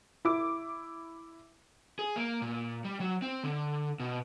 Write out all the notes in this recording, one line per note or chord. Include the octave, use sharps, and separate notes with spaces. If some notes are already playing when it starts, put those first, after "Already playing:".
E4 D6
G#4
A#3
A#2
G3
F#3
C4
D3
B2